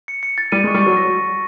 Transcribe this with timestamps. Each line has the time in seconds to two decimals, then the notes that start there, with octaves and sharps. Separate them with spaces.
0.08 C#7
0.23 C#7
0.38 A6
0.52 G3 D#7
0.64 G#3
0.67 C#6
0.74 G3
0.82 F#3 C#6
0.97 A#6